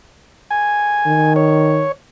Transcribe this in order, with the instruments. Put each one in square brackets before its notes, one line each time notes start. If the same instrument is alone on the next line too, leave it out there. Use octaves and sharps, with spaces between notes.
[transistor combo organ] G#5
[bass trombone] D#3
[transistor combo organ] C#5